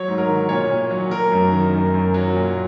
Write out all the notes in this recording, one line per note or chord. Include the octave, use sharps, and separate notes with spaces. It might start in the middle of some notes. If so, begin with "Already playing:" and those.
Already playing: F#3 C#5
G#2
A#4
D#3
A#2 C#5
A#2
F#3
F#3 A#4
F#2
D#3
F#2
F#2
F#3
A#2